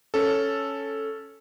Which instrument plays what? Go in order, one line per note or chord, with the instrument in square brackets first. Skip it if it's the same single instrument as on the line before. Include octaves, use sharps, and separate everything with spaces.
[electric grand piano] C#4 A4